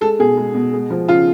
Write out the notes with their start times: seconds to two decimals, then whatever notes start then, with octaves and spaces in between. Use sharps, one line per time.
0.01 G#3 A4
0.19 B2 G#4
0.37 G#3
0.54 B2
0.73 G#3
0.90 F3
1.08 C#3 F4